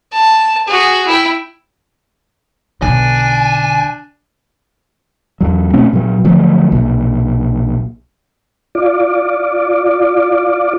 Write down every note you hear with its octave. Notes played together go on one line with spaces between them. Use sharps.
A5
F#4 G#4
E4 G5
B1 D3 D4 G#5
E2 F#3
B2 A3 C4 C#4
A#2 F#3
D3 F3 F#3 A3
B1 A#2
F4 D5